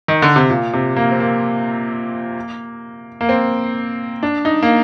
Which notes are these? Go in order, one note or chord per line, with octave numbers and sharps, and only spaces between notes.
D#3
D3
C3
A#2
C3
A#3
C4
A#3
A#3
C4
D4
D#4
A#3